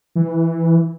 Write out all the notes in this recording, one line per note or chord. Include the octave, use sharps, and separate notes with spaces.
E3